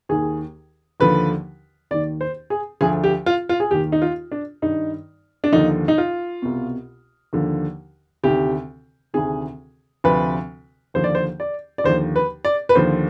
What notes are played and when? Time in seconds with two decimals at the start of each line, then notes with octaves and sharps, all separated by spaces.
0.09 D#2 D#3 G#4
1.00 D#2 D3 F3 B4
1.91 D#2 D#3 D5
2.21 C5
2.50 G#4
2.81 D2 D3 F3 G#4
3.04 G4
3.26 F4
3.49 F4
3.60 G#4
3.71 D#2 D#3 G4
3.92 D#4
4.02 F4
4.32 D4
4.62 G2 D#3 D#4
5.44 D4
5.52 D#2 D3 F3 D#4
5.88 D#4
5.98 F4
6.42 C2 B2
7.33 D#2 D3 F3
8.24 D2 C3 D#3 G4
9.14 D2 C3 D#3 G#4
10.04 D2 C3 F3 B4
10.94 D#2 D3 F3 C5
11.04 D5
11.15 C5
11.40 D5
11.78 D5
11.84 D#2 D3 F3 C5
12.16 B4
12.45 D5
12.69 B4
12.75 D#2 D3 F3 C5